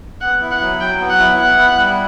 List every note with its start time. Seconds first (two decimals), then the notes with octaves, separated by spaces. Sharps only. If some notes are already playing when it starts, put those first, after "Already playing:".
0.21 B3 F#5
0.41 E4
0.51 F#5
0.61 F#3
0.81 F#3 G5
1.00 B3
1.10 F#5
1.20 E4
1.39 B3 F#5
1.58 E4
1.78 G3